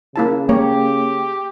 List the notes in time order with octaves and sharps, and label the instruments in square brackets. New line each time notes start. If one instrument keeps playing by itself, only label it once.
[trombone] C#3 [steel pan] A#3 E4 A5
[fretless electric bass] A#3 [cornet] G4 [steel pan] C#5